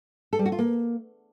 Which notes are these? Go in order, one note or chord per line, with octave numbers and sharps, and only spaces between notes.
A4
G3
F#4
F4
A#3